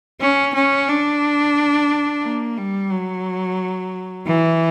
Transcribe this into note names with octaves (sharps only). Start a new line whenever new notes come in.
C#4
C#4
D4
A#3
G3
F#3
E3